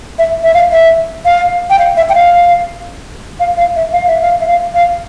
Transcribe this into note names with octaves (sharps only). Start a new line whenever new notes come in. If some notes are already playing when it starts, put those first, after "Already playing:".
E5
E5
F5
E5
F5
G5
F5
E5
G5
F5
F5
F5
E5
F5
E5
F5
E5
F5
F5